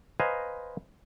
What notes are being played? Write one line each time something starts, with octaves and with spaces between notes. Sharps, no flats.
B4 C5 D#5 F5 G#5 A#5